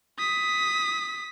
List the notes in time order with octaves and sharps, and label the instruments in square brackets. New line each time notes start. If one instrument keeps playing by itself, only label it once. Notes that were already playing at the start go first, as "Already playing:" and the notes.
[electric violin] D#6 B6